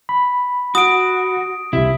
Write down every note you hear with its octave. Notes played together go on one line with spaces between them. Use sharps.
B5
F#4 D#6 D7
C2 C3 E4